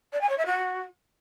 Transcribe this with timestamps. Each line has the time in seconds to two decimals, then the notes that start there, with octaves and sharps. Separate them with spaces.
0.12 D5
0.21 G#5
0.29 C#5
0.37 E5
0.46 F#4